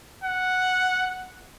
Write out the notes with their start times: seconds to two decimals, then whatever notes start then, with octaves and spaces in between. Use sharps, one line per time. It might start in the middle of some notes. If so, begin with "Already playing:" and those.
0.24 F#5